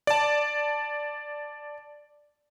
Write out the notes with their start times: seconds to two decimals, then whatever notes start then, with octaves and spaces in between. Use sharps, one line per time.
0.07 D5 A5